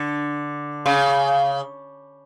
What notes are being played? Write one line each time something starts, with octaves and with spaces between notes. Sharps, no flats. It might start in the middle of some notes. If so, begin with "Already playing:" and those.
Already playing: D3
C#3